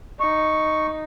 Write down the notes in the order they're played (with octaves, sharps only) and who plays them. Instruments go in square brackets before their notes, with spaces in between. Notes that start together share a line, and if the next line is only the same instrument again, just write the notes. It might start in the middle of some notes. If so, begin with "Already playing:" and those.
[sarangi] D#4 [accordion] C#6